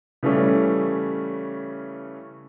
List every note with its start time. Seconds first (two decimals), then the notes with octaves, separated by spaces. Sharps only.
0.23 C#3 E3 G3 A3 C#4